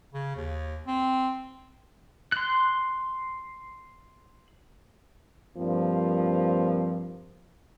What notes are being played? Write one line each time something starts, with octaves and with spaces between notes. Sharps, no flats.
C#3
D#2
C4
C6 F#6
G2 F3 A#3 C4